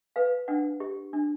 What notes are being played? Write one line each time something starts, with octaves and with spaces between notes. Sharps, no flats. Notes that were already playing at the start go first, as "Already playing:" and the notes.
B4 F5
D4 F#5
G4
D4